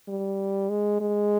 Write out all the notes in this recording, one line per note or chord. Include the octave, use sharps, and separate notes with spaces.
G3
G#3
G#3